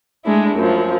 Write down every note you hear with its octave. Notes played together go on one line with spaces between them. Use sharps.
G#3 A3 D4 E4
F#2 F3